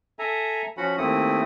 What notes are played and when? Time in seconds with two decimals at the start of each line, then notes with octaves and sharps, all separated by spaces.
0.19 A4 E5 G#5 A#5
0.77 F3 C#4 F#4 F#5 B5
0.98 D#2 A3 A#3 C4 E4 D#6